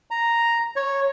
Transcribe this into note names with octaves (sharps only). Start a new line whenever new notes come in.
A#5
C#5